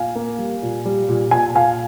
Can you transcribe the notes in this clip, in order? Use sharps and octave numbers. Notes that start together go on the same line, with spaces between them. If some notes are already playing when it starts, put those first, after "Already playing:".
Already playing: A#2 F5 G#5
A#3
G3
A#2
G3
A#2
A#2 G#5
A#2 F5 G#5